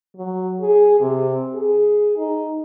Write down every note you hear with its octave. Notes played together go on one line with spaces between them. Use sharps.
F#3
G#4
C3
G#4
D#4